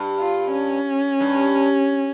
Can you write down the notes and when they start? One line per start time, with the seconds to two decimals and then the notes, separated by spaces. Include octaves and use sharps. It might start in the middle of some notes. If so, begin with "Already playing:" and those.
Already playing: G2
0.19 F4
0.52 C#4
1.20 G2